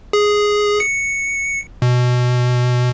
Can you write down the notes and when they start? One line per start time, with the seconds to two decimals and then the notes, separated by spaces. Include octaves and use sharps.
0.13 G#4
0.80 C#7
1.82 B2